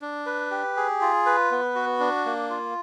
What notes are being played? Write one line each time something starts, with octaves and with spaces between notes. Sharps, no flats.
D4
B4
G4
G#4
F4
B4
B3
F#4
D4
A#3
F4